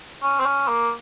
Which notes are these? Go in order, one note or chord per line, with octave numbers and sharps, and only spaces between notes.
C#4
C4
C#4
A#3